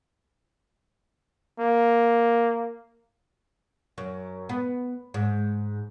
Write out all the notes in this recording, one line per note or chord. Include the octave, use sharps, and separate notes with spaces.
A#3
F#2
B3
G#2